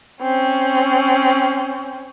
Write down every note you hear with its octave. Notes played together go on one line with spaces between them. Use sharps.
C4 C#4